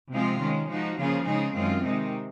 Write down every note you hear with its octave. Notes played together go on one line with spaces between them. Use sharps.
C3 F3 G#3 C4 F4
D#3 G#3 C#4
F3 G#3 D#4 F#4
C#3 F3 A#3 F4 G#4
C#3 G#3 D#4 G#4
F#2 D#3 G#3 C4 F4
C3 D#3 G#3 D#4